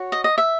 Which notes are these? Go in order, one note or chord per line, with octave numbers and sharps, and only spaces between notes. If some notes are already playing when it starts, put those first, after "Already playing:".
Already playing: F#4 C#5
D#5
D#5
E5